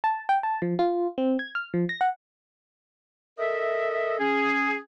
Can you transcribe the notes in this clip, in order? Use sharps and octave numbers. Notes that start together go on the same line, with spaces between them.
A5
G5
A5
F3
F4
C4
G#6
F6
F3
A#6
F#5
A4 A#4 D#5 E5
C#4 G#4